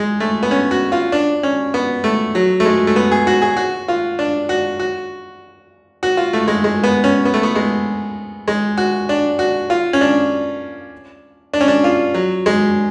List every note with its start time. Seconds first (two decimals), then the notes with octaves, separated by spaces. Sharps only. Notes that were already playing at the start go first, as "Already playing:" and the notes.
Already playing: G#3
0.20 A3
0.43 B3
0.51 C#4
0.71 F#4
0.92 F4
1.12 D4
1.43 C#4
1.74 B3
2.04 A3
2.35 F#3
2.60 A3
2.65 G#3
2.87 A3
2.96 B3
3.11 G#4
3.27 F#4
3.42 G#4
3.57 F#4
3.88 F4
4.19 D4
4.49 F#4
4.80 F#4
6.03 F#4
6.17 F4
6.33 A3
6.48 G#3
6.64 G#3
6.84 B3
7.04 C#4
7.25 B3
7.34 A3
7.43 B3
7.55 G#3
8.48 G#3
8.78 F#4
9.09 D4
9.39 F#4
9.70 F4
9.93 C#4
10.01 D4
11.53 D4
11.61 C#4
11.68 D4
11.84 F4
12.14 F#3
12.46 G#3